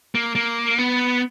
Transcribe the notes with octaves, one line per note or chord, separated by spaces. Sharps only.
A#3
A#3
B3